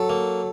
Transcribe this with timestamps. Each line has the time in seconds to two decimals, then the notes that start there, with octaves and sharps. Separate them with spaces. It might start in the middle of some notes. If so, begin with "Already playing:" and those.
Already playing: F#3 A4
0.09 A#3